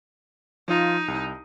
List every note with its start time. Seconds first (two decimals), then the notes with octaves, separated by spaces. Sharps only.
0.68 F3 D#4 F4
1.08 C2